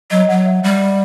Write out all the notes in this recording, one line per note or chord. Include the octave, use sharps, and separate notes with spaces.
F#3 D#5
F#3 F#5
E5
G3